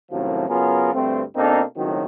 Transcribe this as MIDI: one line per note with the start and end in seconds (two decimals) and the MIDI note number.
0.11 0.48 42
0.11 0.48 45
0.11 0.48 48
0.11 0.48 51
0.11 0.48 53
0.11 0.48 54
0.49 0.93 49
0.49 0.93 54
0.49 0.93 59
0.49 0.93 65
0.49 0.93 68
0.49 0.93 70
0.94 1.22 38
0.94 1.22 43
0.94 1.22 57
0.94 1.22 60
1.36 1.62 47
1.36 1.62 58
1.36 1.62 60
1.36 1.62 62
1.36 1.62 63
1.36 1.62 69
1.77 2.06 37
1.77 2.06 45
1.77 2.06 51
1.77 2.06 54
1.77 2.06 60
1.77 2.06 66